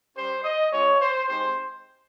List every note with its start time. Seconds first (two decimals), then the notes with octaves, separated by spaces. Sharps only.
0.16 G3 C#4 G4 C5
0.44 D#5
0.72 G#3 C#4 F4 C#5
1.01 C5
1.29 G#3 C4 D#4 G4 C5